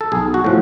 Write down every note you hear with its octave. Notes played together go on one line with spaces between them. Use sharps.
A4
B1 G#4
F#4
A2 F3